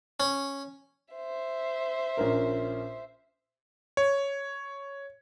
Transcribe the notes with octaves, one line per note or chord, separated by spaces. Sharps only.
C#4
C5 E5
A#1 C#4 A#4
C#5